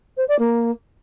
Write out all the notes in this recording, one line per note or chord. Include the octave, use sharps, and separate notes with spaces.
C5
D5
A#3